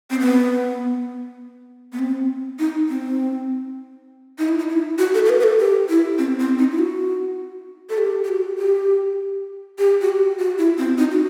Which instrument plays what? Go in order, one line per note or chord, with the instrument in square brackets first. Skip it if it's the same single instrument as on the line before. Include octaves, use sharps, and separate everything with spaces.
[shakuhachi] C4
B3
B3
C4
D#4
C4
D#4
E4
D#4
E4
F#4
A4
A4
B4
B4
A4
G4
E4
C4
C4
D#4
E4
F#4
A4
G4
G4
F#4
G4
G4
F#4
G4
F#4
E4
C4
D#4
F#4